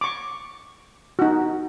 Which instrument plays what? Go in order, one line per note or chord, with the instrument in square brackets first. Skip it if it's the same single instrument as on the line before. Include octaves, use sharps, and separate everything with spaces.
[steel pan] C#6 D6
D#4 F#4